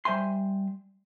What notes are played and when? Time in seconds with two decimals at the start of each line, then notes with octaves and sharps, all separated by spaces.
0.05 G3 C5 E5 G#5 C6